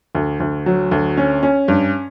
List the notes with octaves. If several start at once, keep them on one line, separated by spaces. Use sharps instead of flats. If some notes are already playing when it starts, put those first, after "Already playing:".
D2
D2
F#3
D2
C#4
C#4
G2